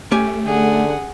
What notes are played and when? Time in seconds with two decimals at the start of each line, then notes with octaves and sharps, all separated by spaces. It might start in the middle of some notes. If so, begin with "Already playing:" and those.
0.11 A3 C#4 G4 G#5
0.46 D3 G#4 F#5